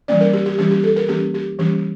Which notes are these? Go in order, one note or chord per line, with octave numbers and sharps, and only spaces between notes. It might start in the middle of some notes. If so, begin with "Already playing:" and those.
E3 G3 A#3 C#4 D5
A#4
G4
G4
E3 G3 A#3 C#4 G4
G4
A4
A#4
E3 G3 A#3 C#4 G4
G4
E3 G3 A#3 C#4 G4